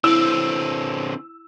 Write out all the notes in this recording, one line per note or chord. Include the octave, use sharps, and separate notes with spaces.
D3 C4 E4 E6